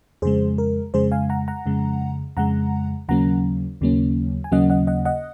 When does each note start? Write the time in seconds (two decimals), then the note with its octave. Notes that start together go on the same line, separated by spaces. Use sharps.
0.22 F2 C#3 G#3 G#4 C5
0.58 A#4
0.94 F2 C#3 G#3 G#4 C5
1.12 F5 G#5
1.30 F#5 A#5
1.48 F#5 A#5
1.66 F2 C#3 G#3
2.37 F2 C#3 G#3 F#5 A#5
3.08 D#2 C#3 F#3 A#3 C#4 F#5 A#5
3.81 D#2 C#3 F#3 A#3 C#4
4.44 G#5
4.51 D#2 C#3 F#3 A#3 C#4 D#5 F#5
4.70 D#5 F#5
4.87 D#5 F#5
5.05 D#5 F#5